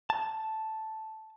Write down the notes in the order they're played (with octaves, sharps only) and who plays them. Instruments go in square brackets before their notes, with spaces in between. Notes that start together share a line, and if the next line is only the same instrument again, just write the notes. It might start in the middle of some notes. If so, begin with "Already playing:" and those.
[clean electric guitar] A5